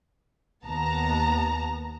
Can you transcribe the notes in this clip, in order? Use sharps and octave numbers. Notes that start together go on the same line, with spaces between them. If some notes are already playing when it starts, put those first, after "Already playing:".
D#2 B3 A5 A#5